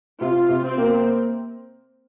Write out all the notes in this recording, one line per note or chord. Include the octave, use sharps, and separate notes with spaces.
C3 F4
C3
C4
A#3